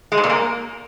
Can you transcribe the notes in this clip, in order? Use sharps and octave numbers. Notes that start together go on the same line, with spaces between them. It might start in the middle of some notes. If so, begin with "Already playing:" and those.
G#3
G#2
A#2
A#3